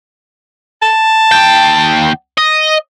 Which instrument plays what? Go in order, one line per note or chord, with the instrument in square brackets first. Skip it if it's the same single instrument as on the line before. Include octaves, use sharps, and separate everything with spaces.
[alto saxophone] A5
[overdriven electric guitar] D#2 G5
D#5